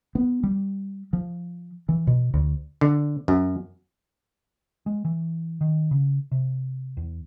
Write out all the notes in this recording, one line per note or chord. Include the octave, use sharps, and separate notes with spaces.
B3
G3
F3
E3
B2
D2
D3
F#2
G#3
E3
D#3
C#3
C3
E2